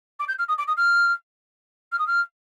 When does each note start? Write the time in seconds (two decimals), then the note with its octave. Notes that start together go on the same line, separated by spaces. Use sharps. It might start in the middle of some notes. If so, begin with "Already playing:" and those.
0.19 D6
0.28 G6
0.38 F6
0.48 D#6
0.58 D6
0.67 D#6
0.77 F6
1.92 F6
1.98 D#6
2.07 F6